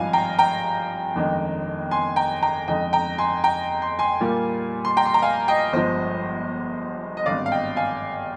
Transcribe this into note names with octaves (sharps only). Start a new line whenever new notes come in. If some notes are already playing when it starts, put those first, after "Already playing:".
Already playing: G#1 G2 F3 G#3 D#4 F5 G#5
G5 A#5
G5 A#5
G1 F2 D#3 G#3 D4
G#5 C6
G5 A#5
G5 A#5
F2 D3 G#3 D#4 D#5 G5
G5 A#5
G#5 C6
G5 A#5
C6
G#5 C6
A#2 G3 A#3 F4
C6
G5 A#5
C6
A#5
F5 G#5
D#5 G5
G1 G2 F3 G#3 C5 D#5
D#5
G#1 G2 D3 D5 F5
F5
D#5 G5
F5 G#5